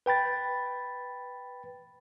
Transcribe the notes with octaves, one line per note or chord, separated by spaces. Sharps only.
B4 G5 B5 A6